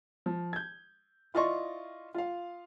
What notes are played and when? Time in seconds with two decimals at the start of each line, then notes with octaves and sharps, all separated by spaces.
0.26 F3
0.53 G6 G#6
1.34 E4 F4 D5 D#5 C6 C#6
2.15 F4 F5